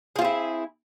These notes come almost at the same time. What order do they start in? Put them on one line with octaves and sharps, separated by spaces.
G#4 F4 C4 E4